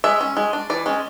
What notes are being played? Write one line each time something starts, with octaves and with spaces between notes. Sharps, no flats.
G#3 E5
C#4
G#3
D4
E3 D5
G#3 C#4